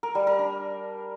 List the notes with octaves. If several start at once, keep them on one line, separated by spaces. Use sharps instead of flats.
A#4
G3
A#4
D4